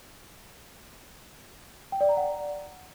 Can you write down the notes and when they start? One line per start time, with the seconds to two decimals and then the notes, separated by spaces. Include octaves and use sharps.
1.92 G5
2.01 D5
2.09 A#5
2.17 F#5